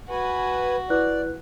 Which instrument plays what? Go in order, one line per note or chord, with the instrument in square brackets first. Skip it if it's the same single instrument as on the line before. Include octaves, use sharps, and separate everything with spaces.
[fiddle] F#4 [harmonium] B4 G#5
[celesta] E4 B4 F#6 [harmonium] D5